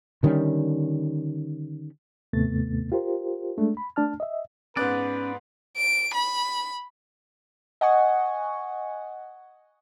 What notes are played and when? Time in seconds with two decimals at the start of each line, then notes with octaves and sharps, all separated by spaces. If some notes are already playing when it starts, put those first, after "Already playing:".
0.23 D3 D#3 G3 C#4
2.33 D#2 G#2 C3 A3 B3 A6
2.92 F4 G4 A#4 C5
3.57 G#3 A3 D4
3.77 B5
3.96 A3 D4 A5 F6
4.20 D#5 E5
4.77 G#2 B3 C#4 B4 D5 F#6
5.77 D7
6.14 B5
7.81 D#5 F#5 G#5 C#6